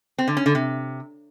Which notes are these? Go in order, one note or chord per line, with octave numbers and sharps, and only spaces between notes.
C4
D3
C#4
D3
C3